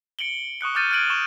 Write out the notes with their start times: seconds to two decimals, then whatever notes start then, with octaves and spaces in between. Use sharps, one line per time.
0.19 C#7 D7 F#7 G7
0.61 C#6 D#6 F#6 C#7
0.75 D6 F6 G6 A6 C#7 D#7
0.91 F6 F#6 G#6 D7 D#7 F#7
1.10 C#6 E7 G7